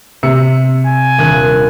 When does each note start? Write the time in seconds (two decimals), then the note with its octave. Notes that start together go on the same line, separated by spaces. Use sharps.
0.23 C3 E6 C#7
0.86 G#5
1.18 D#1 D4 F#6